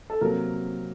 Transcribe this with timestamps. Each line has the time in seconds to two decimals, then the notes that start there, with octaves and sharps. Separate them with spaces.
0.10 A4
0.21 C3 F#3 A#3 A#4